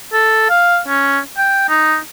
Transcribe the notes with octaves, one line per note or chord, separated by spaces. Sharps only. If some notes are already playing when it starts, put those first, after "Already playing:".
A4
F5
C#4
G5
D#4